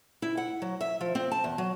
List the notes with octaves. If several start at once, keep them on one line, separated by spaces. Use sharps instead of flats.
E4
F#5
F#3
E5
F3
C4
A5
E2
F#3